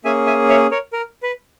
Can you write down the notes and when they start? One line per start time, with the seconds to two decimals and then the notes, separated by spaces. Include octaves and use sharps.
0.04 A#3 C#4 G#4 E5 G#5
0.26 E5 G#5
0.49 C#5 E5
0.71 A#4 C#5
0.93 A#4
1.23 B4